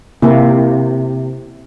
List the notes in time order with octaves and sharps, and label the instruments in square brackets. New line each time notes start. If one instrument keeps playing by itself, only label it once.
[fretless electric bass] C3 [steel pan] A#3 E4